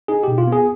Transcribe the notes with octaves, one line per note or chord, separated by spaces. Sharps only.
D#4 G#4
B2 G4
F4
B3
G#4